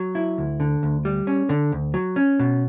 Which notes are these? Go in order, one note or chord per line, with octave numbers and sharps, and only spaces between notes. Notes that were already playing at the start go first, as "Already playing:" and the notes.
Already playing: F#3
E4
D2
D3
D2
G3
C#4
D3
D2
F#3
C#4
B2